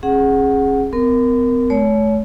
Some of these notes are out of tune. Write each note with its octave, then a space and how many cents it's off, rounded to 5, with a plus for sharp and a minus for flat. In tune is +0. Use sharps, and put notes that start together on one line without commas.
C#4 -35 G#4 +0 F#5 +0
C4 -45 A#4 +0
A3 -40 C#5 +30